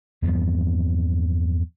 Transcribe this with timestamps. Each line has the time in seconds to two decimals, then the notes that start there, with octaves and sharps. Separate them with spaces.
0.22 E2 G2 F3 B3